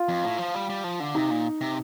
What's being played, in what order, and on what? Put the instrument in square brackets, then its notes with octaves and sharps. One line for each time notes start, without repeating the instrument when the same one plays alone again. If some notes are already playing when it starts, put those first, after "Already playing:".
Already playing: [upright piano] F4
[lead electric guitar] F2
A2
F3
G3
G3
F3
D3
[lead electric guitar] C3 [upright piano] D#4
[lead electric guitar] A#2
C3